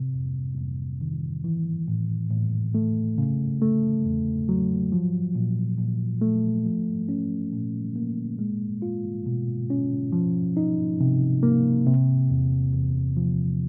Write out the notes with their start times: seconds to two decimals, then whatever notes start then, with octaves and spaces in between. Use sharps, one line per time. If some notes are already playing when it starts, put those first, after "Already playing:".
Already playing: C3
0.14 F2
0.57 F2
1.01 D#3
1.44 E3
1.88 A2
2.30 A2
2.75 A3
3.18 C#3
3.62 A3
4.05 E2
4.49 F#3
4.92 F3
5.35 A#2
5.78 A#2
6.21 A3
6.66 F3
7.09 C#4
7.53 A#2
7.96 A#3
8.39 G#3
8.82 F4
9.26 B2
9.70 C#4
10.12 F3
10.57 D#4
11.00 C3
11.43 A#3
11.87 C3
12.30 E2
12.73 E2
13.17 F3